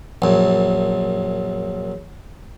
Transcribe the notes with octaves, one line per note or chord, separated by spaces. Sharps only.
A#1 F#2